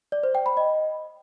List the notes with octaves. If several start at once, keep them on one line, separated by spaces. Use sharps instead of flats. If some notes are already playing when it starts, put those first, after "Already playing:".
D5
C5
G5
B5
D#5